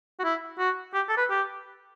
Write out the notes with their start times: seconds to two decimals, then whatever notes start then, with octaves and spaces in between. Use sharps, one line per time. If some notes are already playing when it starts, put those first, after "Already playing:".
0.20 F#4
0.24 E4
0.59 F#4
0.94 G4
1.09 A4
1.18 B4
1.30 G4